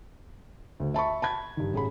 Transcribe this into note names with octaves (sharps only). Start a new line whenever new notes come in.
D2
E5 A5 B5 C#6
A5 B5 G#6
G2 D#3
A1 G#4 B5